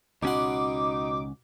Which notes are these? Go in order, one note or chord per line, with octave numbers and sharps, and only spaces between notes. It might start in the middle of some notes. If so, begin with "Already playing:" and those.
C#2 B2 C#4 D#4 F#5 C6 D6